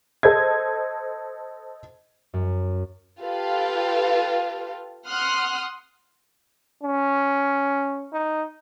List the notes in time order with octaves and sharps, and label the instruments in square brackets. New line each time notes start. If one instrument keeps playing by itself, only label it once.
[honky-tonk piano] A4 C5 D#5 G#6
[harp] F#2
[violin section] F4 G4 A4 B4 F5
F#5 C6 D#6 F6 F#6
[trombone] C#4
D#4